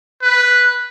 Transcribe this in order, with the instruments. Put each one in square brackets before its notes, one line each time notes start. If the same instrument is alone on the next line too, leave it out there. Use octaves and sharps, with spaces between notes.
[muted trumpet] B4